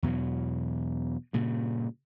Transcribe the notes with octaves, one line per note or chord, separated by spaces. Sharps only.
E2 B2 E3 F#3
G2 A#2 C#3